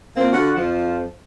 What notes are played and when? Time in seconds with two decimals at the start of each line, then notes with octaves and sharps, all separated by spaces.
0.16 A#2 F3 A#3 C4
0.32 D3 F4 F#4 F#5
0.56 F2 F3